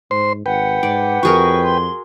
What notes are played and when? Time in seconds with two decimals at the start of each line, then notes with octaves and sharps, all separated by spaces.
0.11 G#2 C5 C6
0.46 G#1 B4 F#5 G5
0.83 G#2 D5
1.23 F2 F#4 G#4 A#4 C#6
1.64 C6